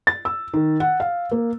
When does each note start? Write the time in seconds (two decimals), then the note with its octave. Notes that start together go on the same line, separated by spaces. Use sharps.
0.07 A6
0.25 E6
0.54 D#3
0.80 F#5
1.00 F5
1.31 A#3